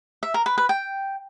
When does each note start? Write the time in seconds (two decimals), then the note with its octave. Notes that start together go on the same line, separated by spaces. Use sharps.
0.23 E5
0.34 A#4
0.46 B4
0.58 B4
0.69 G5